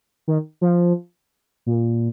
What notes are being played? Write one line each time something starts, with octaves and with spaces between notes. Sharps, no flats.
D#3
F3
A#2